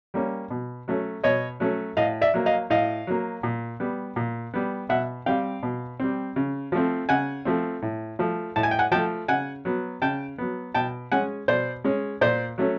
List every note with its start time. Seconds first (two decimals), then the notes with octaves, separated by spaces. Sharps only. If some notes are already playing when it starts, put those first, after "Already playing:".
0.14 G3 A#3 C#4
0.50 B2
0.88 F#3 A3 C#4
1.24 B2 C#5 D#5
1.60 F#3 A3 C#4
1.97 A2 D#5 F5
2.21 D5 E5
2.34 F#3 A#3
2.46 D#5 F5
2.70 A2 D#5 F5
3.07 F#3 A#3
3.43 A#2
3.80 G3 B3
4.16 A#2
4.54 G3 B3
4.89 B2 E5 F#5
5.26 G3 C4 F5 G5
5.63 B2
6.00 G3 C4
6.36 C#3
6.72 F3 A3 C4
7.09 C#3 F#5 G#5
7.45 F3 A3 C4
7.82 A2
8.19 F3 A3
8.56 A2 A5
8.63 G#5
8.71 G5
8.79 F#5 G#5
8.92 F3 A3 G5 A5
9.28 C#3 F#5 G#5
9.65 F#3 B3
10.02 C#3 G5 A5
10.38 F#3 B3
10.74 B2 G5 A5
11.12 G#3 C#4 F#5 G#5
11.48 B2 C5 D5
11.84 G#3 C#4
12.21 A#2 C5 D5
12.58 F#3 A3 C#4